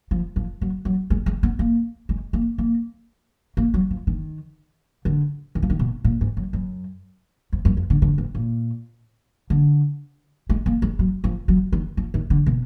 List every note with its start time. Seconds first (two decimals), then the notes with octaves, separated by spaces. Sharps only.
0.11 F3
0.36 F3
0.61 F#3
0.85 F#3
1.10 G#3
1.26 G#3
1.43 B3
1.59 A#3
2.09 G#3
2.33 A#3
2.58 A#3
3.57 A#3
3.74 F#3
3.91 F3
4.07 D#3
5.05 D3
5.55 D#3
5.62 F3
5.70 D#3
5.79 B2
6.04 A#2
6.21 G#2
6.37 F#2
6.53 F#2
7.53 F2
7.65 F#2
7.77 F2
7.90 D3
8.02 D3
8.18 G#2
8.35 A#2
9.50 D3
10.50 G#3
10.66 A#3
10.82 G#3
10.99 F#3
11.24 F3
11.48 F#3
11.72 D#3
11.97 F3
12.14 D#3
12.30 D3
12.46 B2